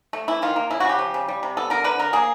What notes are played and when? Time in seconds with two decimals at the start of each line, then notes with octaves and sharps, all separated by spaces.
0.13 A3
0.28 E3 E4
0.42 D#3 F4
0.56 A#3
0.70 C#3 E4
0.80 F#4
0.85 C#3 G4
0.99 F3
1.14 C#3
1.28 G3
1.43 C3
1.57 B3 A4
1.70 D3 A#4
1.84 D3 B4
1.99 D3 A#4
2.13 A#3 G#4